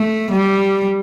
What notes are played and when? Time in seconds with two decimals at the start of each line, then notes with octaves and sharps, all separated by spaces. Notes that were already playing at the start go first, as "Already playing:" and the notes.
Already playing: A3
0.31 G3